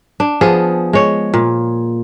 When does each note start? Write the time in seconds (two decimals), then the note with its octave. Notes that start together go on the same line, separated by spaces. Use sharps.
0.20 D4
0.41 F3 B3 G#4
0.93 G#3 C#5
1.34 A#2